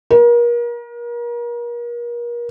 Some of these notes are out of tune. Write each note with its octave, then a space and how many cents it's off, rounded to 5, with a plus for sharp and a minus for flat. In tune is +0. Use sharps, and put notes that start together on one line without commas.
A#4 +35